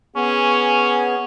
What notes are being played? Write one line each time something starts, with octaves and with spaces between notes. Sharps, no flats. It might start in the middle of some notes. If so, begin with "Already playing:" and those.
B3 C#4 G#4